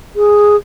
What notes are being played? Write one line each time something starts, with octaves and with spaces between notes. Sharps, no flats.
G#4